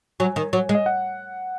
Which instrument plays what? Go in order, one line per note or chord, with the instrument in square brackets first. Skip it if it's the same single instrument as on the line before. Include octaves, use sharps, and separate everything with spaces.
[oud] F#3 [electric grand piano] G#5
[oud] D#3
F#3
G#3
[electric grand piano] D#5
F#5